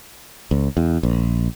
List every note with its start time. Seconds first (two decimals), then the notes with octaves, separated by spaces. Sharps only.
0.51 C#2
0.77 E2
1.03 A#1